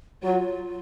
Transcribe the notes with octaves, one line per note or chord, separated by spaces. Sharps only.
F#3 F4